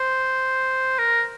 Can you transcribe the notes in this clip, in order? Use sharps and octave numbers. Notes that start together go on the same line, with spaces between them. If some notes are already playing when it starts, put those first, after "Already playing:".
Already playing: C5
A#4